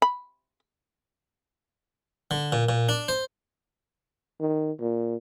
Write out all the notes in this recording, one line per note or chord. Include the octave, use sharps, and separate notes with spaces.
B5
D3
A#2
A#2
D4
C5
D#3
A#2